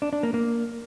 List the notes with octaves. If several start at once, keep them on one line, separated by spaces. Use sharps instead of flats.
D4
D4
A#3
A#3